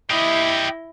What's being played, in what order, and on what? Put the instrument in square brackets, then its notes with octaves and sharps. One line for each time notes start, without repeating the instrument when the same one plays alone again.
[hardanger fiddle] E4 [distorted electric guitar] G4 D#5